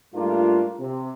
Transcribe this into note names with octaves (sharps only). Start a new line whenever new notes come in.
G#2 G3 A3 A#3 D4 F4
C3